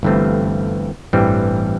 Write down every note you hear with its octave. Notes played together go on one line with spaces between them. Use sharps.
G1 G2 E3 A3 C4
A1 G2 E3 G3 C4